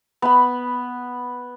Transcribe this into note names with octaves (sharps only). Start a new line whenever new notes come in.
B3 B5